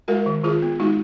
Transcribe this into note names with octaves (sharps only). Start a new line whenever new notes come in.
G#3 F#4 A#4
D#3
D#3 F4 G#4
B3
G#3 D#4 F#4